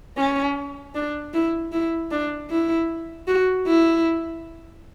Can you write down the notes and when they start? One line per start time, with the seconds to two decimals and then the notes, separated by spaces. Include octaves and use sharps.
0.18 C#4
0.95 D4
1.34 E4
1.72 E4
2.11 D4
2.50 E4
3.28 F#4
3.67 E4